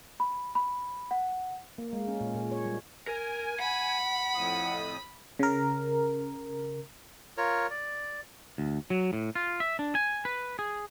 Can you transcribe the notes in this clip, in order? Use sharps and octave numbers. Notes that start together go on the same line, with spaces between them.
B5
B5
F#5
A#3
G#3
C#4
A#2
A#2
C#5
G3
A#4 G#5
F#5 B5
F2 A2 D#6
C#3 A#4
F4 A#4 C#5
D5
D2
F#3
A2
F4
E5
D4
G#5
B4
G#4